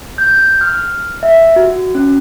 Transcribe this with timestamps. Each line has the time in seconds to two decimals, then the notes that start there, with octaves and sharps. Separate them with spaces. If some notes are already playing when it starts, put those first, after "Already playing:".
0.18 G6
0.61 F6
1.23 E5
1.56 F#4
1.95 C#4